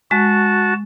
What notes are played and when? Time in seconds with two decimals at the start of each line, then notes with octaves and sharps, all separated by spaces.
0.11 G#3 F#4 A5